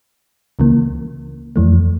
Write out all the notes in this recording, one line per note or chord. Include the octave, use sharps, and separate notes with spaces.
C#2 C#3 E3 A#3
F2 E3 A3